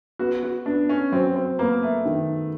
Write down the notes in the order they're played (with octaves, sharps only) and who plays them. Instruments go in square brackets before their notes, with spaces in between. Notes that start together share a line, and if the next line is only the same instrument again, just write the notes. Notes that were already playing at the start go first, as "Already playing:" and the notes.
[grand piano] B3 [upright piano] F#4
[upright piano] F#4
[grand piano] B3 [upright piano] D4
[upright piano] C#4
[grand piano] F#3 [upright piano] C4
[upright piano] C4
[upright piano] A#3 [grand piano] B3
[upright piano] A3
[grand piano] D#3